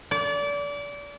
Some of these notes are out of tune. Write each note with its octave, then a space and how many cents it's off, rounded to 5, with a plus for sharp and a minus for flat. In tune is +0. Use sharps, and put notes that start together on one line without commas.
D5 -30